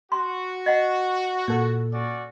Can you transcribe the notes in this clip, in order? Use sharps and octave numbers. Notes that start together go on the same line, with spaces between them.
F#4 C6
D#5 F#5
A#2 A4
C#4 F#4 D5